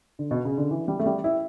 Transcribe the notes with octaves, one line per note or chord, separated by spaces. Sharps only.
D3
B2
C#3
D3
E3
G3
A3
G3
E4